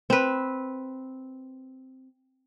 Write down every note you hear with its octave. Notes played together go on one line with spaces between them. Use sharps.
C4 B4